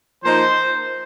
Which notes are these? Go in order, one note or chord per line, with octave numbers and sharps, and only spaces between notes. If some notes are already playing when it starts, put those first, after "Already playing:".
F3 A#3 D#4 C5